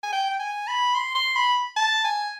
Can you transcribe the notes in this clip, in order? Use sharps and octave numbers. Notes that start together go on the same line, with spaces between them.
G#5
G5
G5
G#5
B5
C6
C6
B5
A5
G#5